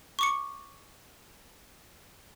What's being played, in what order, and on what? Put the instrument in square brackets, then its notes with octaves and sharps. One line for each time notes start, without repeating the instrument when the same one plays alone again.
[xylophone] C#6 D6 C#7